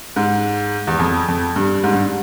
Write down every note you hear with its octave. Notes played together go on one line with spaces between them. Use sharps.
G#2
E2
F2
F2
G2
G#2
G2